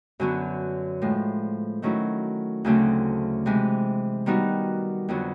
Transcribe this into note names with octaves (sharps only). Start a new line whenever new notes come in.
F#2 D3 F#3 B3
A2 F3 G#3
D#3 F#3 A3 C#4 E4
D2 C#3 F#3 A3 C4
C3 E3 G#3
D#3 G3 B3 D#4 F#4
F2 D3 F#3 B3